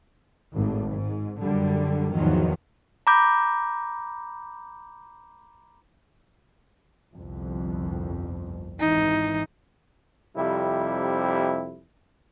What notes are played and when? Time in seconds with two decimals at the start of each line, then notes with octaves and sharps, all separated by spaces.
0.56 G#1 A2
0.93 G#2
1.41 F#2 D3 G3
2.13 E2 G#2 D#3 F3 F#3
3.07 A#5 B5 D6 G6
7.15 G1 C2 F2
8.80 G#1 E3 D#4
10.36 F2 C3 G3 E4